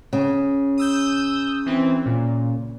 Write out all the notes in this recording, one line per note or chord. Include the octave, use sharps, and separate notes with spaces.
C#3
D#6 E6 G6
E3 C4
A#2